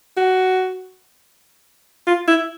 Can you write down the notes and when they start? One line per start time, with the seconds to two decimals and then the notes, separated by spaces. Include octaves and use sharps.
0.17 F#4
2.07 F4
2.28 E4